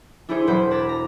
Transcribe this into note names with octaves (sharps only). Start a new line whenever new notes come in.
D4 E4 G4 G#4 C5 C#7
E1 F#3 B4 C5 B5
B4 A5 A#5 D6 G#6 B6
A#5